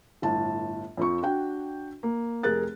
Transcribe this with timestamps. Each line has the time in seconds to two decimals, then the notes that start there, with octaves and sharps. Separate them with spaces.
0.22 G1 A2 A5
0.97 F2 F3 C#6
1.22 D4 F#4 G5
2.03 A#3
2.43 F1 G#4 A#4 F#6 A6